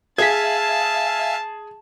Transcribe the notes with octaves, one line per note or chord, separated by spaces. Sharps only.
G#4 E5 F5 G#5 A5 G#6 B6